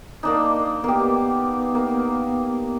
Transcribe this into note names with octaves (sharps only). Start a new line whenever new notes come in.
A#3 D4 D#4
A#3 B3 G4
A#3